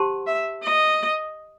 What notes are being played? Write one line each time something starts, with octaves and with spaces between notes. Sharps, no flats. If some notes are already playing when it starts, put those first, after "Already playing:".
Already playing: G4 C5 F#5 A5 C6
E5
D#5